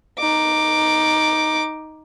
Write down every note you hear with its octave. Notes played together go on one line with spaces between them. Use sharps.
D#4 D6